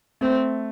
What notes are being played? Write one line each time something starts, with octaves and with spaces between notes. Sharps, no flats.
A3 C4